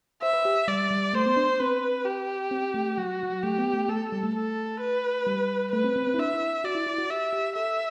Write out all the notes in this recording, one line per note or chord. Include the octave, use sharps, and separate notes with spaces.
C5 E5
B4
G4
G3 D5
G3
A3 C5
B3
D4
C4 B4
G4
C4
A3
F#3 F#4
F#3
A3 G4
B3
A3
A3 A4
G3
A3
A4
B4
G3
A3 B4
C4
C4
C4
E4
D4 E5
E4
F#4 D5
E4
E4
F#4
G4 E5
G4
A4 E5